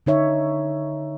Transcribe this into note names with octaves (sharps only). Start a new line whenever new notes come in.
D3 D#4 C#5 E5